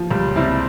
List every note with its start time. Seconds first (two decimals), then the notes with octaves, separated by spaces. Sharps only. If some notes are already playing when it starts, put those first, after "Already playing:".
Already playing: F3
0.11 C#2 G3
0.36 C3 G3 C4 E4